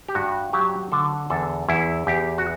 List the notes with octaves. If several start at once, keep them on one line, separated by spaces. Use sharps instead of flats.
G4
G2 F#4
F#3 G4
D3 A4
E2 A4
E2 E4
E2 G4
F#4